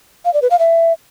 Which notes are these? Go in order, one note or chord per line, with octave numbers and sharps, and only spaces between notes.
F5
D5
B4
F5
E5